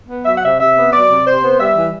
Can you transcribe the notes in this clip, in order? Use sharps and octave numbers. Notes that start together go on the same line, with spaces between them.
B3
F#3 E5
F#5
C3 E5
C3 E5
B3
F#3 D5
C3
C3 C5
B3
G3 E5
E3